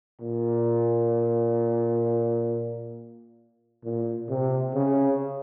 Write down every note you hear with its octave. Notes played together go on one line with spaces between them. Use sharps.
A#2
A#2
C3
C#3